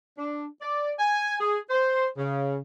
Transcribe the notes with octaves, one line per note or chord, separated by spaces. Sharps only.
D4
D5
G#5
G#4
C5
C#3